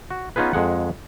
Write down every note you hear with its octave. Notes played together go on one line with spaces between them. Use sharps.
F#4
B3 C#4 D#4 F4 G#4 B4
F2 G#3 F#5